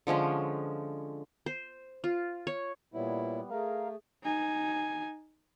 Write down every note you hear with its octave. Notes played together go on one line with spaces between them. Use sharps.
D3 F3 G#3 C#4
C5
F4
C#5
A#2 G3 B3 E4 C#5
A3 G#4 A#4 F5
D#4 G#5